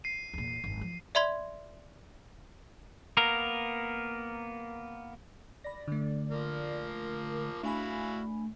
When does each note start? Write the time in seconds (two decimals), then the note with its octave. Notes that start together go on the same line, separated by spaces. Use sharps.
0.04 C7 D#7
0.34 E2 A#2
0.64 G#1 F#2
0.81 F3
1.15 D5 E5 B5 C6 G#6 G7
3.17 A#3 B3 A#4
5.64 D5 B5 A#6
5.88 D3 A3
6.32 F3 A#3
6.89 A#4
7.63 A3 D4 E4 F#4 F5 G#5 B5